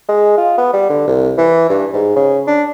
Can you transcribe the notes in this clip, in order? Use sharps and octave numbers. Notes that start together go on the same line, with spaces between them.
G#3
F4
B3
G3
D3
C2
E3
G2
G#2
C#3
D4